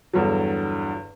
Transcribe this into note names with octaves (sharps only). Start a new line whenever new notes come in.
E2 G2 D3 F#3